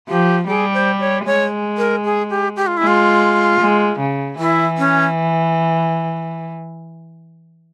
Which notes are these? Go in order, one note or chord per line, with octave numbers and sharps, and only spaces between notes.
F3 G4
G3 G#4
C5
C#5
G#3 C#5
A#4
G#4
G4
G4
F4
E4
G#3 F4
G#3
C#3
E3 E4
C#4